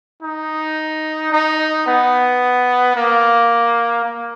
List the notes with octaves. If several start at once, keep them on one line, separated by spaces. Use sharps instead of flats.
D#4
D#4
B3
A#3
A#3